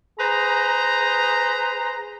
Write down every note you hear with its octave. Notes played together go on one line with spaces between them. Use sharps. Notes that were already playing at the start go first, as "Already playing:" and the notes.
G#4 B4 C5 A#5